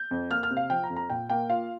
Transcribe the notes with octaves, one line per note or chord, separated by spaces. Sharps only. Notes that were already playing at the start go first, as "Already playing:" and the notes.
Already playing: G6
F2
A#3 F6
F6
C3
F5
F3 G5
A#5
F2
A#5
A#2 G5
A#3 G5
F4 F5